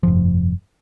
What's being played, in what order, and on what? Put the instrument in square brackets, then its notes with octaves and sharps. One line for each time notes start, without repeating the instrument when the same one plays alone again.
[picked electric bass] F1 E2 G2 F3